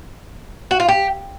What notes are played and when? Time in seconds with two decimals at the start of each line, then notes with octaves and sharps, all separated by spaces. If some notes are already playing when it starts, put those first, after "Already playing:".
0.71 F#4
0.80 F4
0.88 G4